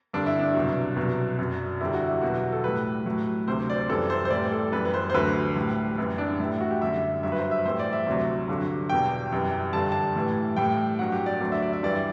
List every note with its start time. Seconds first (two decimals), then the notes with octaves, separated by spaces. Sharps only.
0.13 G2 D3 G3 D4
0.26 E4
0.39 D4
0.55 C2 B2 F#3
0.96 C2 B2 F#3
1.39 F#2 F#3
1.81 E2 D3 G3 E4
1.94 F#4
2.08 E4
2.22 E2 B2 F#3 F#4
2.52 A4
2.64 A2 G3 B4
3.06 A2 F#3
3.48 D2 C3 F#3 C5
3.70 D5
3.76 C5
3.89 F#2 E3 G3 A4
4.10 C5
4.25 C5
4.30 A2 E3 G3 D5
4.52 A4
4.72 F#2 E3 G3 B4
4.85 B4
4.94 C5
5.10 C5
5.14 D2 D3 F#3 B4
5.56 A2 G3
5.98 F#2 E3 G3
6.18 D4
6.40 A2 G3 E4
6.61 F#4
6.71 G4
6.81 F#2 D3 G3 E5
7.23 G2 F#3 E5
7.32 B4
7.38 C5
7.51 E5
7.65 A2 E3 G3 C5
7.79 D5
7.93 E5
8.07 D2 C3 F#3
8.48 G2 D3 F#3
8.90 E2 B2 G3 G5
9.32 F#2 E3 G3
9.73 G2 D3 G3 A5
9.92 A5
10.16 A2 E3 G3
10.56 A2 G3 G5
10.78 G5
10.99 G2 F#3 F#5
11.12 G4
11.26 D5
11.40 D2 D3 F#3 D5
11.52 E5
11.62 D5
11.73 E5
11.83 G2 E3 G3 D5